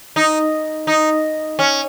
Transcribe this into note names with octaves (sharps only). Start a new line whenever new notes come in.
D#4
D#4
C#4